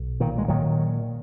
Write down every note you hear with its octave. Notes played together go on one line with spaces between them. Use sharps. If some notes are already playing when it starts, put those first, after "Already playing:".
Already playing: B1
A#2 D#3
G#3
A#2 D#3 F#3